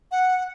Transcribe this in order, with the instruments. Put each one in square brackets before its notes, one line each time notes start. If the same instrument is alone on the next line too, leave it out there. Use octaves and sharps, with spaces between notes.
[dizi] F#5